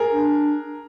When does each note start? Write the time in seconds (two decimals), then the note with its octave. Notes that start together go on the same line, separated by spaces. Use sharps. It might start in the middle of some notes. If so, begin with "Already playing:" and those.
Already playing: G#4 A#4
0.12 D4